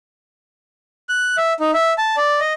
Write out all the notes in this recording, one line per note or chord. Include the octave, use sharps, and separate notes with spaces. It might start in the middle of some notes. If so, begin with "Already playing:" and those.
F#6
E5
D#4
E5
A5
D5
D#5